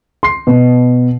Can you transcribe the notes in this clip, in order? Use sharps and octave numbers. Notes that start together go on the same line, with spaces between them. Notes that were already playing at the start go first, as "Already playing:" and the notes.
C6 C7
B2